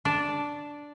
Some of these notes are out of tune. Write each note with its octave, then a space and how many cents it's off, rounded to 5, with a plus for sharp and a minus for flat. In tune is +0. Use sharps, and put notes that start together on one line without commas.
D4 -5